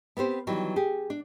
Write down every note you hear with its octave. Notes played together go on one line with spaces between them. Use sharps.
B3 C4 G4 C5
D#3 E3 F#3 G3
G4 G#4
D4